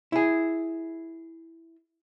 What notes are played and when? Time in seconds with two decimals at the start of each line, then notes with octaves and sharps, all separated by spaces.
0.12 E4 G#4